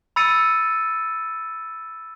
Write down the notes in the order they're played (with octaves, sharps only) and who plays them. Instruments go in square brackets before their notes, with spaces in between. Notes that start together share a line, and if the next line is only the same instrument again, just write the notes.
[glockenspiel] B5 E6 A6 C#7 D#7